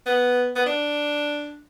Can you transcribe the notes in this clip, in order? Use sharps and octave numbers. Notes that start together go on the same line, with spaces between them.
B3
B3
D4